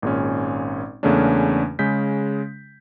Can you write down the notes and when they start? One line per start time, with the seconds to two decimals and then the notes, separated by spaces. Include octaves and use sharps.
0.02 G#1 A#2 G#3 C#4
1.03 E2 C#3 A3 A#3 C#4 D4
1.79 C#3 G#3 C#4 G6 B6